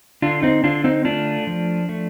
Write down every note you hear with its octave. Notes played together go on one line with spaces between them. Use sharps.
D3 D4 F4
C4 D#4
D3 D4 F4
C4 D#4
A3 D4 F4
F3
A3